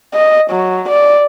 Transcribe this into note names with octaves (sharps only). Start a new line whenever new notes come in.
D#5
F#3
D5